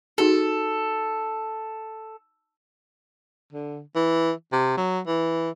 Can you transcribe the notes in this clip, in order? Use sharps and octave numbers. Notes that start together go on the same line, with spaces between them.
D#4 F#4 G#4 A4
D3
E3
C3
F#3
E3